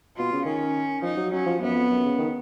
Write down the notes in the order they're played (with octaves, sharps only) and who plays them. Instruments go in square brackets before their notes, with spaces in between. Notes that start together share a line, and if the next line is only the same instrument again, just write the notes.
[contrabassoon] B2 [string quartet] F4
[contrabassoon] C#3
[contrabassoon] D#3 [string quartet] C#4
[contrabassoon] F3 [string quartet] D#4
[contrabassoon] F#3
[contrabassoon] F#3 [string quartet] C#4
[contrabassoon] F3
[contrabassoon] F#2 [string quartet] B3
[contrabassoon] F2
F#2
C#3
D#3